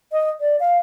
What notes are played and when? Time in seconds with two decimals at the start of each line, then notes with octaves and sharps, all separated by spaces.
0.12 D#5
0.40 D5
0.60 F5